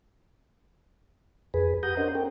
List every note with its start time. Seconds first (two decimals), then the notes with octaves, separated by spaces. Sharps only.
1.54 F2 G#4 B4
1.83 G4 F#5 A#5 D#6 G6
1.97 C#4 D4 A#4 C5 D#5 F#5
2.15 C#4 A4 A#4 G5